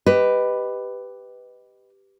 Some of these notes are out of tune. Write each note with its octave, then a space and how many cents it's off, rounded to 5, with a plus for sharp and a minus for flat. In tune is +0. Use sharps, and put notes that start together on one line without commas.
G4 +0 B4 +10 D#5 +0